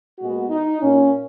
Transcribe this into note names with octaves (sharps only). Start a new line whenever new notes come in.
A#2 G#3 B3 F#4
D#4
A#2 A#3 C#4